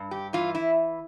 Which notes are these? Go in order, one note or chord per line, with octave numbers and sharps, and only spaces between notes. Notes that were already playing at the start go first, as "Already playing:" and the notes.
Already playing: G2
G4
E3 F4
E4